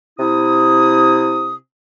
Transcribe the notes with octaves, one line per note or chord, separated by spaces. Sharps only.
C3 E4 D#6